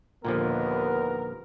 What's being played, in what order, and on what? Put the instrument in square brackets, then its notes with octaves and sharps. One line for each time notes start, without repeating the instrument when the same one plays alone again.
[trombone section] D#2 B3 [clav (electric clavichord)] A#2 D3 F3 [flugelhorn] A#4